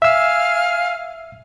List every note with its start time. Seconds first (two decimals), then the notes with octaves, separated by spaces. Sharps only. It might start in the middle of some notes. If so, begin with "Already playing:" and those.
0.02 E5 F5 G#5 E6 F6